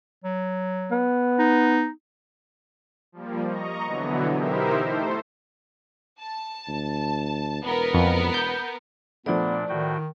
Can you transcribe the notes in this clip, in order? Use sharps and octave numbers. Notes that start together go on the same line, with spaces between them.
F#3
B3
D#4
F3 G3 A#3
D#5 A#5 C#6
B2 D3 E3 F#3 B3
D#4 E4 G4 A#4 C5 E5
A3 A4 C5
A5
D2
E1 B3 A#4
F2
G6
A#2 F3 A3 B3 D4 D5
A2 D#3 F#4 G5